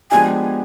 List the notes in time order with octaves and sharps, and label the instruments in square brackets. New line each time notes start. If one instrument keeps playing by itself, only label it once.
[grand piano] F3 G#3 B3 D4 G4 [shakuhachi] G#5